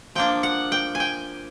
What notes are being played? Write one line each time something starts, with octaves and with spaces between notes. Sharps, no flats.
F3 A#3 D4 G5
F#5
G5
G#5
G5